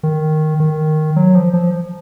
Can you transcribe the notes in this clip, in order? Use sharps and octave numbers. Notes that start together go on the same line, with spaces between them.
D#3
D#3
F#3
F3
F3